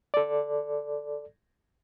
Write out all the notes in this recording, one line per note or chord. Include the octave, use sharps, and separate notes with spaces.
A4 D5